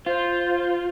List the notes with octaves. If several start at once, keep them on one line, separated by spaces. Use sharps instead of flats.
F4 C5